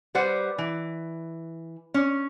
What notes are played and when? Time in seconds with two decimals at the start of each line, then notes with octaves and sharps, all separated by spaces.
0.15 G3 B4 C5 F#5
0.58 E3
1.94 C#4